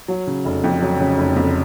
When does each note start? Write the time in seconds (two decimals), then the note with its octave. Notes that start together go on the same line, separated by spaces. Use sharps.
0.08 F#3
0.27 C#3
0.45 F1
0.64 F2
0.82 F#3
1.00 C#3
1.18 F1
1.36 F2